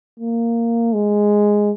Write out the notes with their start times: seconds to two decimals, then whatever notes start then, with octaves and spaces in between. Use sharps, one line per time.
0.20 A#3
0.94 G#3